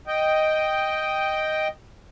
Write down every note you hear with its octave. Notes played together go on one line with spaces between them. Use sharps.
D#5 G5